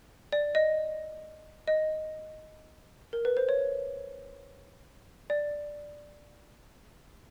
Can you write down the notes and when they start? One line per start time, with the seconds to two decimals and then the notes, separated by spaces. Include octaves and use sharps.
0.32 D5
0.55 D#5
1.68 D#5
3.13 A#4
3.25 B4
3.37 C5
3.49 C#5
5.30 D5